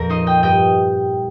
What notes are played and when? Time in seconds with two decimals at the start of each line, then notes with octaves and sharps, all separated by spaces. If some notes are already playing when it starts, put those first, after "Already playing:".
Already playing: F2 A#2 A#4
0.10 D#4 C5 D#5
0.27 D#5 G5
0.43 G2 D#5 G5